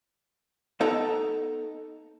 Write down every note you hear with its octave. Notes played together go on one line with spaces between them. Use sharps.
B3 D#4 A4 A5 A#5